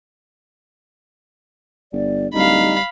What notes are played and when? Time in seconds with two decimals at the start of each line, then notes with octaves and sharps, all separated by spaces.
1.93 G1 D5
2.34 D1 G3 D#4 F5 B5